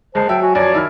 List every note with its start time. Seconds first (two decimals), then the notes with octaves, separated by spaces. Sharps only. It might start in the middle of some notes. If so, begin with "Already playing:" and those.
0.15 F#1 G#3 C5 A5
0.29 F#3 E5 G5
0.42 F#4 G#5
0.55 F#2 F3 C#5 D5
0.74 D#3 E4 E5 F6